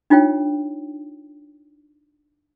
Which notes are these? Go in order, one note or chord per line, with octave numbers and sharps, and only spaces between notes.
D4 D#4 F4 C#5 G5